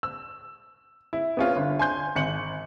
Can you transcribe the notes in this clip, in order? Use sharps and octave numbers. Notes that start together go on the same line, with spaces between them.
E6
E4
B3 C#4 F4
G1
G#5 C6 G6
G#1 C#7 F#7